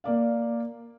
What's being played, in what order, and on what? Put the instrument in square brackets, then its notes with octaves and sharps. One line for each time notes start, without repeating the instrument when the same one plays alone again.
[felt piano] A#3 D5 F5